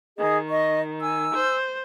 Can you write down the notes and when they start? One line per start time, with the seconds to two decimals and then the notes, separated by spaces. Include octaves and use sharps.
0.17 D#3 G#4 D#5 D#6
0.49 D#5 C#6
1.00 G#5 E6
1.34 C5